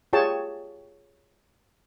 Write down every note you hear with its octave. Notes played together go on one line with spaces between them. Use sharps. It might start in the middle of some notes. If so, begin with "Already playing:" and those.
F4 G4 G#4 C#5 G5 A5